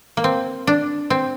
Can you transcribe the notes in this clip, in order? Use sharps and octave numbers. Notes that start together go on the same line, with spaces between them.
A#3
C4
D4
C4